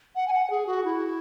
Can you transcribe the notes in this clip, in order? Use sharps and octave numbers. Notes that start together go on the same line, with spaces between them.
F#5
G#5
F#5
G#4
F#4
E4